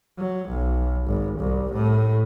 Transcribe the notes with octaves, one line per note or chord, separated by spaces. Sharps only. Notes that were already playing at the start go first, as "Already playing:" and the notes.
F#3
B1
G#1
C2
A2